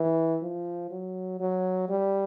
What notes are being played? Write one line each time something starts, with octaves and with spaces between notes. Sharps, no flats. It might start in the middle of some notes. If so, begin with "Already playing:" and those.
Already playing: E3
F3
F#3
F#3
G3